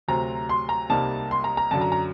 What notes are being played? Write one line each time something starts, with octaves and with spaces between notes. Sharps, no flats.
D2 C3 F#3 C4 A#5
C6
A#5
C2 C3 G3 A#3 D#4 A5
C6
A#5
A#5
F#2 D3 F#3 A5
A#5
A#5